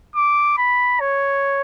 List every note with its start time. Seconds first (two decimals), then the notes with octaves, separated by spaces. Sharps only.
0.16 D6
0.58 B5
1.00 C#5